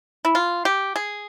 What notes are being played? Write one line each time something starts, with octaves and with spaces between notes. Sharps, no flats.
E4
F4
G4
G#4